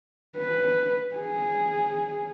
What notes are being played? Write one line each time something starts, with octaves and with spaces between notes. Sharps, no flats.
B4
G#4